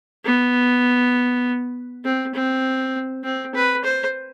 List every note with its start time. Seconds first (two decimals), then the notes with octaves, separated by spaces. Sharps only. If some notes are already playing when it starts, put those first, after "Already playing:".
0.25 B3
2.05 C4
2.34 C4
3.24 C4
3.54 B4
3.84 C5